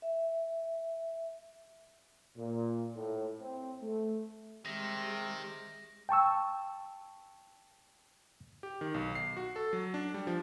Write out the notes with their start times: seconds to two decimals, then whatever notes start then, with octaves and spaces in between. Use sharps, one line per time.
0.02 E5
2.36 A#2
2.95 A2
3.41 C4
3.81 A3
4.66 C3 D#3 G3 G#3 A#6
6.09 G5 A5 C#6 E6
8.63 G4
8.81 D#3
8.94 B1
9.15 C7
9.37 F#4
9.56 A4
9.73 F#3
9.94 D4
10.14 G3
10.27 F3